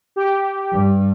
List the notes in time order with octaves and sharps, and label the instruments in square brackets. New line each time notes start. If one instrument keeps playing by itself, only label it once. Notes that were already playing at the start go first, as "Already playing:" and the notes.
[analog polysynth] G4
[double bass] G2